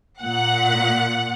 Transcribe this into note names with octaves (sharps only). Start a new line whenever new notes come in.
A#2 F#5